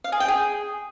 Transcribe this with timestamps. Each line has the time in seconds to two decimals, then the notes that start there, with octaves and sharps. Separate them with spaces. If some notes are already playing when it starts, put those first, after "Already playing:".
0.04 F5
0.12 G#4
0.20 G5
0.28 G#4